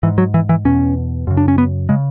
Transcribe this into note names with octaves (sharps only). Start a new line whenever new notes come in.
G#2 E3
F#3
E3
E3
E2 B2 C#4
F#2 C#3
D4
C#4
B3
C#3 G#3